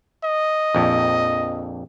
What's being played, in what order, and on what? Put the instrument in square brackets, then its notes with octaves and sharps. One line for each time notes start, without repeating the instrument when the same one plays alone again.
[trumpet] D#5
[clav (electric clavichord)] A#1 F2